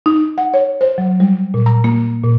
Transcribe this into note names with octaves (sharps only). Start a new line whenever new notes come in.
D#4
F#5
C#5
C5
F#3
G3
A#2
A#5
A#3
A#2